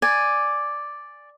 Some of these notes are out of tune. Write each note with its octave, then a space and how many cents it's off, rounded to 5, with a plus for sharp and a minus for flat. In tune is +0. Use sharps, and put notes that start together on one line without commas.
D5 +0 G#5 -5